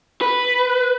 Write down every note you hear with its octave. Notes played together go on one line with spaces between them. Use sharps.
B4